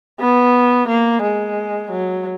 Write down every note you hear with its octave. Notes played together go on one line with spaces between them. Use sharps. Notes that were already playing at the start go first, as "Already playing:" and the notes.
B3
A#3
G#3
F#3